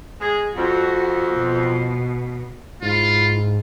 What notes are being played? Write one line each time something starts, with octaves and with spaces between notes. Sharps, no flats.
G#3 G#4
F2 F#4
B2
G#2 E4 F4